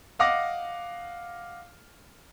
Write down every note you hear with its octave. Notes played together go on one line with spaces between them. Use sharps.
D#5 F5 F#5 D6 A#6